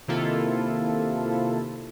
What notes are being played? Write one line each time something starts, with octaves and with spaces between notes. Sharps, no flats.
C3 D#3 A#3 E4 F4 A4